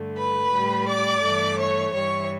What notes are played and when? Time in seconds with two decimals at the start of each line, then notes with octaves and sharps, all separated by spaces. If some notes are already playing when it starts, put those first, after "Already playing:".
Already playing: G2 D3 A3
0.17 B4 B5
0.53 A2 G3
0.87 D5 D6
1.23 G2 E3 A3
1.58 C#5 C#6
1.93 G2 E3 G3 C#5 C#6